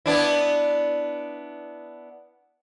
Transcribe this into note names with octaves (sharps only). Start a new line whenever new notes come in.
B3 D4 E4